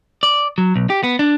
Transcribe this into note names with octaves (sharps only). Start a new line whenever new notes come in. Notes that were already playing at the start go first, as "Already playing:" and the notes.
D5
F#3
B1
G4
B3
D4